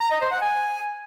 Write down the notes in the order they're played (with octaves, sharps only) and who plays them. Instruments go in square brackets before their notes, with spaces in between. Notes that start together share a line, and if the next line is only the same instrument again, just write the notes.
[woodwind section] A#5
D#5
C5
F#5
G#5